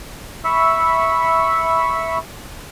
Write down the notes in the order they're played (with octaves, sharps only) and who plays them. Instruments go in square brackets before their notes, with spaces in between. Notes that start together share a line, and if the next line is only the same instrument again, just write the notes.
[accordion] E5 B5 C#6 E6